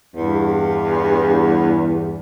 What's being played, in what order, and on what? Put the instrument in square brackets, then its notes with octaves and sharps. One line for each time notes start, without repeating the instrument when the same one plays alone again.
[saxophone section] E2 G2